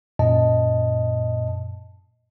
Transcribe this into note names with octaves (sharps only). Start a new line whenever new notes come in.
F#2 A#2 D#5 A5